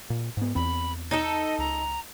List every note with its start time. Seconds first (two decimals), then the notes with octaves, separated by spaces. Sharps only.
0.10 A#2
0.37 G#2 B3
0.55 E2 C4 B5
1.11 D#4 A4 D#5
1.59 C#2 A#5